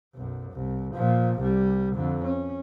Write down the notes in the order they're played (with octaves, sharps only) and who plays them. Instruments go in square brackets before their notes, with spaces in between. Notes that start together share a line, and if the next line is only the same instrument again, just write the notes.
[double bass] B1 F#2
C2
A#2 F3
C2 G3
F2 D3
C#4